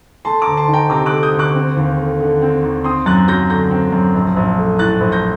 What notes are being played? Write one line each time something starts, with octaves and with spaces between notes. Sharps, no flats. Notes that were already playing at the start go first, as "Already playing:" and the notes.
A3 A5 C6
A#5 D6
D2
A5 C6
D#3
G5 A#5
C3 A#5 D6
D6 F#6
A3
D#6 G6
D2
D6 F#6
C4
D#2
A3
D3
C4
D#2
C4 C6 D#6
F#2 F#6 A6
F#3 G6 A#6
D3 G6 A#6
C4
F#2
A#1
A#1
A3
A2 F#6 A6
A#1
G6 A#6